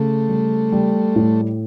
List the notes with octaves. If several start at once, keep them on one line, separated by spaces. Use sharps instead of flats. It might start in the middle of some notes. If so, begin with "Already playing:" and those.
Already playing: C#3 A3
G3
G3
A2